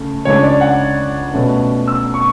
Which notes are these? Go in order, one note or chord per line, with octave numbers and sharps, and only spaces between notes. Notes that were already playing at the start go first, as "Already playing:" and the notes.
Already playing: C#3 A3 C#4
C#2 C#3 G#3 D4 C#5
D5
F#5
B2 A3 C#4
E6
C#6